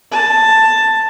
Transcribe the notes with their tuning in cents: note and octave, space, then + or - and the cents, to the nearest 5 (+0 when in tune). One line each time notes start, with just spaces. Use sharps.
A5 +10